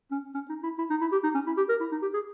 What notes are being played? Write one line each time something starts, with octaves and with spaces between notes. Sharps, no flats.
C#4
C#4
D#4
E4
E4
D#4
E4
G4
D#4
C#4
E4
G4
A#4
E4
D#4
G4
G#4